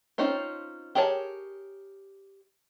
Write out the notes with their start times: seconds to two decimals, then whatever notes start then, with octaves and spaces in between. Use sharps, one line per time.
0.18 C4 C#4 D#4 F4 C5
0.95 G4 G#4 A#4 C#5 A5